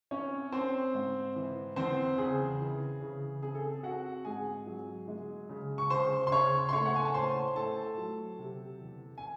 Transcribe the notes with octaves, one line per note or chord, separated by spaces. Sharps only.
C4 C#4 C#5
C4 C5
G#2
E3
E2 C4 C5
C#3 G#4
E3
C#3
C4 G#4
A4
G#4
C4 F#4 F#5
G#2 G#4 G#5
F#3
G#3
C#3
C#6
C#3 C5 C6
C6
C#3 C#5 C#6
C6
A3 C#5 C#6
F#5
G#5
A5
A2 C5 C6
A2 A4 A5
F#3
C3
E2
G#5